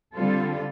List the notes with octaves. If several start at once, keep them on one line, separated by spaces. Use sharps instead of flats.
D3 G3 C4 F4 A4